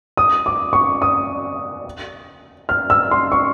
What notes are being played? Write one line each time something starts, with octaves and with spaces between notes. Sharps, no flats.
D#6
D6
C#6
D#6
F6
E6
C6
C#6